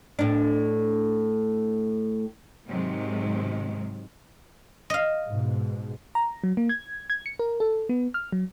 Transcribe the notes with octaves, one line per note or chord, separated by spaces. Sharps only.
A2 D4
G#2 C3 D#3 F#3 G#3
D#5 F5
G#2 B2
A#5
F#3
A#3
G#6
G#6
C#7
A#4
A4
B3
F6
F#3